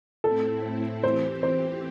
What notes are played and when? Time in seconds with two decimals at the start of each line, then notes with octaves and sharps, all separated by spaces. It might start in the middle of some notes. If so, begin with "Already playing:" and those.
0.24 A2 A3 C4 E4 A4
1.03 E3 C4 G4 C5
1.43 C5